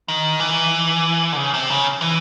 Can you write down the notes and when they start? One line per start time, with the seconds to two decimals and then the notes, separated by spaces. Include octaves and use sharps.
0.08 D#3
0.40 E3
1.32 D3
1.37 C#3
1.54 C3
1.69 C#3
2.01 E3